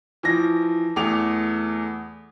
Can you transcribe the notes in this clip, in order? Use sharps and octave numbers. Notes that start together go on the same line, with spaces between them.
E3 F3 A#6
E2 A3 D6 F7